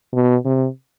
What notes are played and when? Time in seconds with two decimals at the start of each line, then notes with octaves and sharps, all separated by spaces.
0.14 B2
0.45 C3